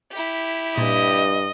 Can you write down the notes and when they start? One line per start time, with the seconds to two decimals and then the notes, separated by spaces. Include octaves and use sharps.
0.11 E4 G4
0.78 G2 A#2 D#5